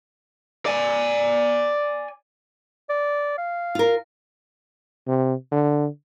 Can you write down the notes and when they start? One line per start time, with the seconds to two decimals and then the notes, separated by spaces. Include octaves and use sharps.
0.66 D5 G#5
2.89 D5
3.38 F5
3.75 F4 A#4
5.07 C3
5.51 D3